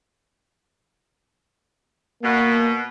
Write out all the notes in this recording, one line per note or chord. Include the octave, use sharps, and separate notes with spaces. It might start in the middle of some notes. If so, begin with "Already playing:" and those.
B2 A#3